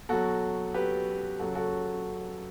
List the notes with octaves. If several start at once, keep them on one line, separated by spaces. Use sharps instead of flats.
B2 F#3 F#4 A4
G4 B4
F#2 C#3 F#3 F#4 A4
F#4 A4